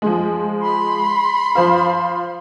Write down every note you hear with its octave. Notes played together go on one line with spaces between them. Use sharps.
F3 G#3
B5 C6
F3 C5 F5